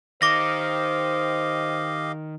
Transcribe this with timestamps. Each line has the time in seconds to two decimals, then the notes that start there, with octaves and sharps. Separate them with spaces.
0.22 D#3 G4 C5 D#5 F5 D6 A#6